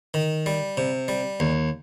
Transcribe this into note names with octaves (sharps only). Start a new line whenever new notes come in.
D#3
G3
C3
G3
D#2